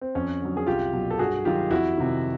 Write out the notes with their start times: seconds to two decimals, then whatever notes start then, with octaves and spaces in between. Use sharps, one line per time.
0.01 C4
0.15 F2 C#4
0.41 D3 F#3
0.57 G#4
0.66 C2 F4 G4
0.93 B2 F#3
1.10 A4
1.19 G2 F#4 G#4
1.45 D#3 F#3 F4 G4
1.71 F2 E4 F#4
1.97 C3 D#3